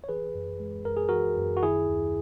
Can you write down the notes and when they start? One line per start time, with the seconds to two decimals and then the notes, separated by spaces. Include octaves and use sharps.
0.04 C#5
0.09 E3 G#4 B4
0.35 F#2
0.60 G#3
0.85 F#2 A#4
0.97 G#4
1.09 E3 F#4 A#4
1.37 F#2
1.57 F#4
1.63 D#3 E4 G#4
1.87 D#2